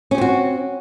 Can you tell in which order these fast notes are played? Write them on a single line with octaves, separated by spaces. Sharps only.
C#4 G4 C4 F#4